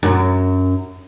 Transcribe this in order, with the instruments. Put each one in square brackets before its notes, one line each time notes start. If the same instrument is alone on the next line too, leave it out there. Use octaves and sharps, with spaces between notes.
[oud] F#2